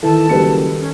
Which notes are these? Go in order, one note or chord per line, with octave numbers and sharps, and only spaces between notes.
D#3 E3 A4 A5
F#1 G3 B4 C#7
C#4